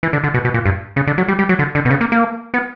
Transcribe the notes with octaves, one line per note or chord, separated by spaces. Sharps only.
E3
D3
D3
B2
B2
A#2
G2
C#3
D3
F#3
G3
G3
F#3
D3
D3
B2
C#3
A#3
A#3
B3